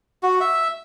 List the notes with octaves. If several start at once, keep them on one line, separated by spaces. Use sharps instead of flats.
F#4
E5